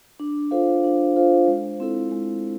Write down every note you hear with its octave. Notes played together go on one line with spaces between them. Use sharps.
D4
F4 A4 C5 F5
D4
F4 A4 C5 F5
G#3
C4 E4 A4
G#3